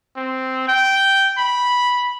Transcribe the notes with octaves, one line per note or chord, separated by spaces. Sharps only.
C4
G5
B5